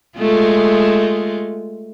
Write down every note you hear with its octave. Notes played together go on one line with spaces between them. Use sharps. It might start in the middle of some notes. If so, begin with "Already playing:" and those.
G#3 A3 F4